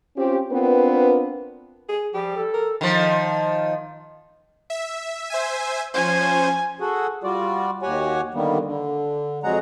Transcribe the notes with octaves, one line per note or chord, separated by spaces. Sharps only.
C4 C#4 F4 G4
B3 C4 D4 F4 A#4 B4
G#4
F3 G3 G4
A4
A#4
D#3 F3
E5
C5 E5 G#5
F3 C#4 C5 G#5
F#4 G#4 A4 F#5
G3 F4 F#4 D5
D#2 F#4 G4 C#5 F#5 G#5
D3 D#3 G3 A#3 B3
D3
F2 F#3 G#3 G#4 F#5 A#5